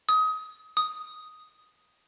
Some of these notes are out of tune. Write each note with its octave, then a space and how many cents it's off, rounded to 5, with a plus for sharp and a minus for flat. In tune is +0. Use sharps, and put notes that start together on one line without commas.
D#6 +25
D#6 +0